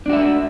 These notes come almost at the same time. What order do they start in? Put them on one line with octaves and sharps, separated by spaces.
D4 F#4 E5